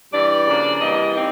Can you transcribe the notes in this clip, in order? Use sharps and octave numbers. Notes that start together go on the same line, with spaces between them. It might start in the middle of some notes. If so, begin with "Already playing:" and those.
G2 E3 G3 D5
C#3 F3 A#3 D4
C3 E3 G3 A#3 D#5
C4 D#4 D5